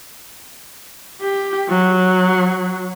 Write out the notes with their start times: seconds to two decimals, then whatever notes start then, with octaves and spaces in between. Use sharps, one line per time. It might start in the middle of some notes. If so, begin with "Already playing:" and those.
1.21 G4
1.69 F#3